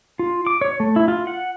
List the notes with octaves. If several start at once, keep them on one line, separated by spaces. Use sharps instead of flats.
F4
D6
C#5
A3
E4
F4
F#5